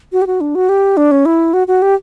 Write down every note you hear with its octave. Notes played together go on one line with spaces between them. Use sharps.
F#4
G4
F#4
D4
F#4
G4
D4
C#4
E4
F#4
F#4
G4